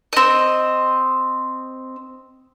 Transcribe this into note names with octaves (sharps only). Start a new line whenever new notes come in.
C4 D#5